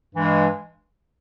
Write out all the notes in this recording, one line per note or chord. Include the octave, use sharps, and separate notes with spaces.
G2 E3 G#3